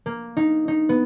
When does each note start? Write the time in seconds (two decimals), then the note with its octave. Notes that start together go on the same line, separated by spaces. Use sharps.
0.06 A#3
0.37 D#4
0.68 D#4
0.89 B3